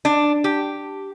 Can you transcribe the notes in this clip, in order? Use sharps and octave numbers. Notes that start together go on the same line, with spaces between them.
D4
G4